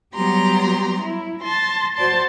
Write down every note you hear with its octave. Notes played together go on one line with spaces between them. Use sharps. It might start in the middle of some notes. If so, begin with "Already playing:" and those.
F#3 G3 B3 G4 A#5 C6
E4
A5 C6 A#6
F#4 C5 D5 A5 C6